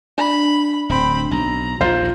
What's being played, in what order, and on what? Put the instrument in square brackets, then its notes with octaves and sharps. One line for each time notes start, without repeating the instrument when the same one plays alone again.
[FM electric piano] D4 [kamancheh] B5
[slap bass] D1 [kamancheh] C4 B5
[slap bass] B1 [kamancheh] A#5
[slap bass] A#1 D#2 [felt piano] F4 C5